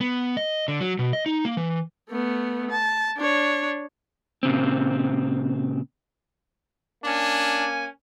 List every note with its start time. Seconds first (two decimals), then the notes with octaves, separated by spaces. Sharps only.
0.01 B3
0.37 D#5
0.68 D3
0.81 F#3
0.99 B2
1.13 D#5
1.26 D#4
1.45 A#3
1.57 E3
2.10 A3 B3
2.71 A5
3.17 D4 C#5
4.43 A#2 C#3 C4
7.04 A#3 C#4 D4 G#5